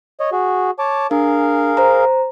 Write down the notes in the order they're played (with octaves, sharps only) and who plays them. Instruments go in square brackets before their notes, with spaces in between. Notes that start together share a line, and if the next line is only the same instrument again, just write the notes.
[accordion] C#5 D#5
F#4 G#4
C#5 A5 D6
[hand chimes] D4 [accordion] G#4 A#4 F5
[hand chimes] C5 A#5